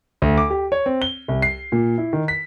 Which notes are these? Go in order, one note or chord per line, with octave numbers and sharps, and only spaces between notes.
D2
D6
G4
C#5
C4
G7
C2
C7
A#2
E4
D#3
B6